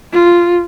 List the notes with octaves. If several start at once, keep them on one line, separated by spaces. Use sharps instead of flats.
F4